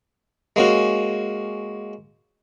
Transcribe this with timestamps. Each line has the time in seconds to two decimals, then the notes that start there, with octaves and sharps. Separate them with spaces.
0.56 G#3 A#3 C#4 F#4